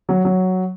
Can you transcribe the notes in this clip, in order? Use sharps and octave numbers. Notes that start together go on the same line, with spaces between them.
F#3
F#3